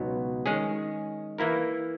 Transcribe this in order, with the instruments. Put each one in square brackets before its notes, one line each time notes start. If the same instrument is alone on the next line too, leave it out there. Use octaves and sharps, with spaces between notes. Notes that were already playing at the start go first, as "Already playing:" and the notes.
Already playing: [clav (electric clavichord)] C#2 B2 F#3 B3 D#4
D#3 G#3 C#4 G#4
E3 A#3 E4 A#4